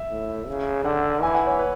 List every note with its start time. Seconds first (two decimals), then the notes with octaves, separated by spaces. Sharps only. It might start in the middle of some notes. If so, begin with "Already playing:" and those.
Already playing: E5
0.11 A2
0.47 C#3
0.84 D3 F#5
1.22 E3 G#5
1.35 F#5
1.47 C#5
1.59 B4